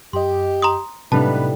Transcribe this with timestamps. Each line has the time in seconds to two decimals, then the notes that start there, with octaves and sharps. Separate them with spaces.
0.13 F#2 G4 D#5 C6
0.62 A#5 C6 D#6
1.12 A2 C3 G3 B3 D4 D#4 B4 A5